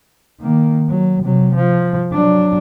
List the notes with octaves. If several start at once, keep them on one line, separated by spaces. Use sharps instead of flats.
D#3 A#3
F#3
C3 F#3
F3
F#3 D4